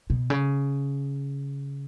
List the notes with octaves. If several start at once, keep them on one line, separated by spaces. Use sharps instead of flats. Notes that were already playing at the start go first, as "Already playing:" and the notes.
B2
C#3